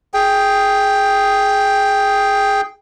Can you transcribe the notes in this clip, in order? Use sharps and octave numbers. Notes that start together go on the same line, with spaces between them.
G#4 G5